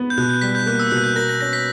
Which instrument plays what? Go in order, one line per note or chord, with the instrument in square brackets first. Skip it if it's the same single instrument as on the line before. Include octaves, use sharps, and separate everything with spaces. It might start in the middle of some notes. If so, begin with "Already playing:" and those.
Already playing: [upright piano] B3 B4
[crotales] G6
[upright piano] B2 [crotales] F#6
[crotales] G6
[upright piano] G3 [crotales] B6
[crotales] G6
[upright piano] A#3 [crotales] F#6
[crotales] E6
[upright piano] B2 [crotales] F#6
[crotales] G6
[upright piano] A#4 [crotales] A#6
[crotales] A#6
[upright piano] C#4 [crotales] A#6
[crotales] B6